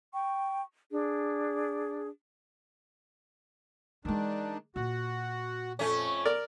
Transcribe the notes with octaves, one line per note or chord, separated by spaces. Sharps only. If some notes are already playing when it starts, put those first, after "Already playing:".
G5 C#6
D4 G#4
D#3 E3 G#3 D4
A#2 F#4
F2 A3 C#4
A#4 D5